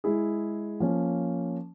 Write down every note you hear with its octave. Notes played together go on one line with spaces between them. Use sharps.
G#3 E4 G#4
F3 A#3 C#4